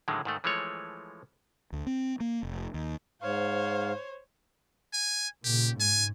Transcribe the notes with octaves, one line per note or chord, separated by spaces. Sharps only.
A2 D3 D#3 F#3 G#3
G#2 D#3 A3
E3 F3 G#3 A3 C#5
D2
C4
A#3
F1
D#2
G#2 C5 C#5 F5
G#5
A#2 C#3 G4
G#2 G#5